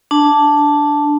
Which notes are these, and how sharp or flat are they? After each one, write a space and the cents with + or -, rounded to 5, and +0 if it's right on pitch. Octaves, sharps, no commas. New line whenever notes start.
D4 -5 A5 +0